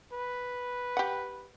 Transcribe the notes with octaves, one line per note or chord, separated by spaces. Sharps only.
B4
G4 F#5